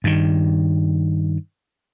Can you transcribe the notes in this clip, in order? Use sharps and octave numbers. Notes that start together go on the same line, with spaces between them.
G2 D#3